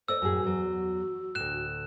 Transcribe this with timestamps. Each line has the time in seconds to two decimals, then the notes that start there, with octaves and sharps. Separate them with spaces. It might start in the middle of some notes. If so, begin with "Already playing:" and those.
0.08 A4 C5 D5 D#5 E6
0.22 F#2 A2 F#4 G#4
0.44 E2 F#3
1.35 D2 A2 F#6 E7